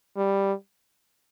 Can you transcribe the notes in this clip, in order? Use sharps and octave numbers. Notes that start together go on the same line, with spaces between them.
G3